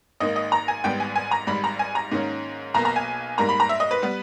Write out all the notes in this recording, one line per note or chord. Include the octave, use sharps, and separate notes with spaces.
G#1 G#2 D#3 A#3 D#5
D#5
A#5
G#5
G#1 G#2 G3 B3 G5
G#5
G#5
A#5
G#1 G#2 G3 B5
A#5
G#5
A#5
G#2 D#3 A#3 C#4
B1 B2 A#3 A#5
A#5
G#5
G#2 G3 A#3 A#5
B5
A#5
E5
D#5
B4
G3 B3